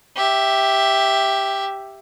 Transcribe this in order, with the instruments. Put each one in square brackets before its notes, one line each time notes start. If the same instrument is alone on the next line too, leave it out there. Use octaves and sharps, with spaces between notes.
[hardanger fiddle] G4 E5